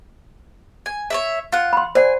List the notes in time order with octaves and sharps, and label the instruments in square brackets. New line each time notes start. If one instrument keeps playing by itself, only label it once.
[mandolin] G#5
C#5 D5 E5
F4 F#5
[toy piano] B5 C6
[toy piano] C5 D5 F#5 [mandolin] G#5